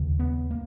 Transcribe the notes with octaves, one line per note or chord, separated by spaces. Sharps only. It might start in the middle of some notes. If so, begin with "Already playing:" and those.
Already playing: D#2 C#3
B3
A#3